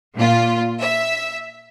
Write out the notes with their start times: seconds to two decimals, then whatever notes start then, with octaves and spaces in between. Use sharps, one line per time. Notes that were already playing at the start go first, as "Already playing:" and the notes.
0.15 A#2 F4
0.81 E5